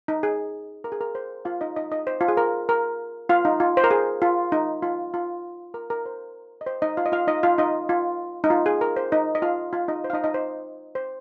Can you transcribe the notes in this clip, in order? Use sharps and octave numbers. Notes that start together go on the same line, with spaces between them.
D#4
G#4
A#4
G#4
A#4
C5
F4 F5
D#4 D#5
D#4 D#5
D#4 D#5
C5
F4
G#4
A#4
A#4
F4 F5
D#4
F4
C5
A#4
G#4
F4
D#4
F4
F4
A#4
A#4
C5
D#5
C5
D#4 D#5
F4 F5
D#5
F4 F5
D#4 D#5
F4 F5
D#4 D#5
F4
D#4
F4
G#4
A#4
C5
D#4 D#5
D#5
F4 F5
F4 F5
D#4 D#5
C5
F5
D#4 D#5
D#4 D#5
C5
C5